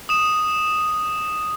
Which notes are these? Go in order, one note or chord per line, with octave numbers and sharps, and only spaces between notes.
D#6 E7